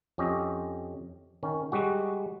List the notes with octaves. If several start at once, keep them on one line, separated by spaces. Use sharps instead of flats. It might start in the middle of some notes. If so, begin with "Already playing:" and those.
F2 C#4 G4 D#5
D#3 C#4
G3 G#3 F#4